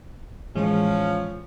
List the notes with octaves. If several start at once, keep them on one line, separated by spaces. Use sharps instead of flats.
A2 E3 F3 G#3 C#4